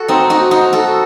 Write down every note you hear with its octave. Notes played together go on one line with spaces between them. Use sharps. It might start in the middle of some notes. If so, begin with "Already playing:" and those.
Already playing: F#4 A4
C4 D#4
D#4 F#4
D#4 F#4
F#4 A4